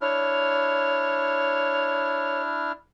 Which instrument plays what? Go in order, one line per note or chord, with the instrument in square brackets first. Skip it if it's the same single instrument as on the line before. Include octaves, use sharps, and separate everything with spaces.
[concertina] D4 E4 F6 [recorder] C#5